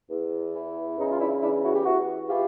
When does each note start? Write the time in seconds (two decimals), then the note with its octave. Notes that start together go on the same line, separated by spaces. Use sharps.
0.10 E2
0.54 E3
0.97 C#3 D#4
1.10 F4
1.19 D4 E4
1.41 E2 D4 E4
1.63 E4 F#4
1.75 G4
1.84 E2 E4 F#4
2.28 E3 F4 G4